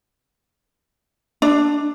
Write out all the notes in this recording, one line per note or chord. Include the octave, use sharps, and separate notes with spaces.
D4